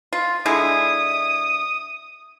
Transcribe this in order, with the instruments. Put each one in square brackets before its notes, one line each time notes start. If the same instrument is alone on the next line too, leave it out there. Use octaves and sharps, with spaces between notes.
[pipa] F4
[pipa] D3 G#3 E4 [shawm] D#6